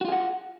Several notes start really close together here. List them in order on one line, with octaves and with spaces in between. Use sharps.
F#4 F4 G#4 F#5